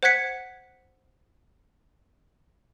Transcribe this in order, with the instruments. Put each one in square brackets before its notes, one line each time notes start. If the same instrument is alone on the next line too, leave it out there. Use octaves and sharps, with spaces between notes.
[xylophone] C5 F#5 F#6 G#6 B6 C#7